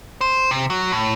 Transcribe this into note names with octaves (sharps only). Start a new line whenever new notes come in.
C5
C3
F#3
A2